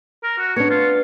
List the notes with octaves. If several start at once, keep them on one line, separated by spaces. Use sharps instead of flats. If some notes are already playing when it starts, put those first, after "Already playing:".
A#4
F#4
B3 D4 C#5
F4